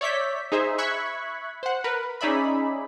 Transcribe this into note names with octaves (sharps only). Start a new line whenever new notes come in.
C#5 D5 E5 G6 B6
D#4 G#4 C5 E5
E5 B5 C#6 F#6 G#6 B6
C5 F#5
A#4 B4
C#4 D#4 G#4 D5 E5 B5